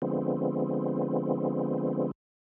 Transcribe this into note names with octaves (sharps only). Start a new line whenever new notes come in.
D3 F3 G#3 B3 C4